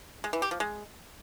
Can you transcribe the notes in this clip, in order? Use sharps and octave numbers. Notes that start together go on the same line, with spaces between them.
G#3
E3
G4
F3
G#3